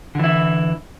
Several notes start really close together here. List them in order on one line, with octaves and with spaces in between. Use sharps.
D3 E3 E4